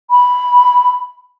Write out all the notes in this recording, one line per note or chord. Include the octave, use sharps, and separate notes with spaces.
B5